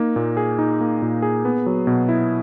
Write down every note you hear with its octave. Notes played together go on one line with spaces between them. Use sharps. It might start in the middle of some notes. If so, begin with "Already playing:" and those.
Already playing: A#3 D#4
A#2
G#4
D#4
A#3
A#2
G#4
B3
F#3
B2
E4